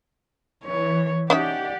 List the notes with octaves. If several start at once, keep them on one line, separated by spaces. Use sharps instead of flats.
E3 C#5
C#4 D#4 G4 D5 E5 F#5